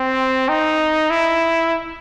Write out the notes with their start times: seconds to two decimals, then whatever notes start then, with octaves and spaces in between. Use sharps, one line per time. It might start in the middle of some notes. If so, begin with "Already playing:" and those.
Already playing: C4
0.49 D#4
1.10 E4